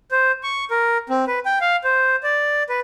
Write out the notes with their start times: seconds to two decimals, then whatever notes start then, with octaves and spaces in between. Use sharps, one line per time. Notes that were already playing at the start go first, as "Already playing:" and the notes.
0.11 C5
0.43 C#6
0.71 A#4
1.10 C4
1.27 B4
1.46 G5
1.61 F5
1.84 C5
2.23 D5
2.69 B4